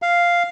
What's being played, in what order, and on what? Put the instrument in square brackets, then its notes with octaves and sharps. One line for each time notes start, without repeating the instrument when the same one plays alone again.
[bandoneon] F5